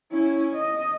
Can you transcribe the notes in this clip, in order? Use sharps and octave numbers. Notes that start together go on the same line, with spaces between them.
C#4 E4
D#5